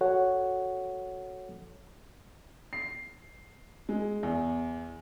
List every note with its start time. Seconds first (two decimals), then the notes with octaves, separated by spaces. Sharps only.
0.01 F#4 A4 C#5 F#5
2.73 C7
3.89 G#3
4.23 E2